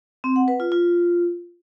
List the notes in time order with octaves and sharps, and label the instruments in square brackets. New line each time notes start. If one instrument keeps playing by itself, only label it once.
[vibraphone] C4
F#5
B4
F4
F4